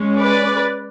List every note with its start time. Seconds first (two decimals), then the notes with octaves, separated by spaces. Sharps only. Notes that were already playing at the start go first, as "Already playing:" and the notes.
Already playing: G#3 C#4
0.18 B4 D5